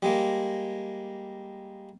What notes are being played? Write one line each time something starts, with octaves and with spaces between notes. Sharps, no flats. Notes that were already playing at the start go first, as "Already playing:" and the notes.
G3 G#3 A#3